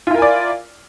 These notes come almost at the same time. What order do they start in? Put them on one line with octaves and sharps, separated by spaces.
F4 E4 A#4 G#5 D5